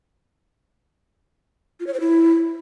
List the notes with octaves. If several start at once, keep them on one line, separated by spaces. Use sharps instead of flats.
F4
C#5
C5
E4